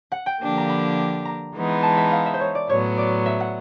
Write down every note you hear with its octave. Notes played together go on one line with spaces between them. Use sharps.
F#5
G5
D3 F3 A#3 D4 G4
A#5
B5
A#5
E3 G#3 B3 D#4
A5
E5
F5
E5
C5
C#5
D5
A2 F#3 B3 C#5
D5
E5
F#5